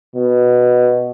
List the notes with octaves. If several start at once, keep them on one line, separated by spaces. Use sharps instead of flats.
B2